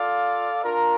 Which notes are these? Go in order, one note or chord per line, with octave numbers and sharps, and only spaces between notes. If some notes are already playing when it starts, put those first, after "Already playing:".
Already playing: F4 A4 D5 F5
D4 F4 A#4